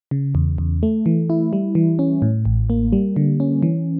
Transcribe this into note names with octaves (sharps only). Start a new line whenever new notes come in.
C#3
E2
E2
A3
E3
E4
G3
E3
C#4
A2
A1
A#3
G3
D3
C#4
E3